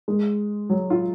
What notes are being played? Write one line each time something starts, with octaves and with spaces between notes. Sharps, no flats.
G#3
F#3
F4